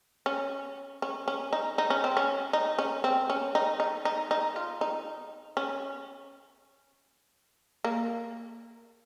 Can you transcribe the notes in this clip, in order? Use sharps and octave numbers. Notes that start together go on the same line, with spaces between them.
C#4
C#4
C#4
D#4
D#4
C#4
C4
C#4
D#4
C#4
C4
C#4
D#4
D#4
D#4
D#4
F4
D#4
C#4
A#3